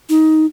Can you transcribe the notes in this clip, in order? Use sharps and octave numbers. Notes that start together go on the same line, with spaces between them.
D#4